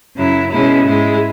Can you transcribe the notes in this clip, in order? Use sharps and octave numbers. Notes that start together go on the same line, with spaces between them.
F#2 C#3 F#3 E4
B2 G#3 C#4 E4
G#2 G#3 E4